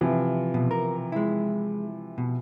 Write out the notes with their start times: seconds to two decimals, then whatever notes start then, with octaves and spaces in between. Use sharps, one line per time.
0.01 C3 E3 F3
0.54 B2
0.71 A#4
1.12 G#3 E4
2.18 B2